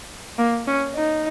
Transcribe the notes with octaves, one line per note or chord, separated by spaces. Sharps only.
A#3
C#4
D#4